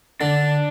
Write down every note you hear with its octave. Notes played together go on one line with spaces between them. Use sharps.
D3 D4